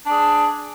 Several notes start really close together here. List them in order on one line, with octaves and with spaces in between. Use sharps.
D4 D5 G#4